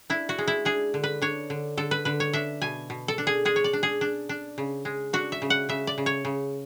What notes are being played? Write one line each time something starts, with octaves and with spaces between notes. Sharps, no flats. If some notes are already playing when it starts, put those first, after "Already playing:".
D4 E4
F#4
G#3
E4
D4 G#4
D3
B4
D4 C#5
D3
D3 A4
B4
D3 B4
C#5
D4 E5
B2 G#5
B2
A4
D4
G#4
G#3 G#4
C#5
D5
D4
G#4
D4
D4
C#3
G#3
D4 F#4
E5
C#3
F#5
C#3 E5
D5
C#3
C#5
C#3